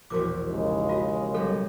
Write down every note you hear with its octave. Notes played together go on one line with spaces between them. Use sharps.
E1 A#1 F#4 A#4 D6
D#2 C#3 G#3
F4 F#4 D#5
B1 G3 B3 A4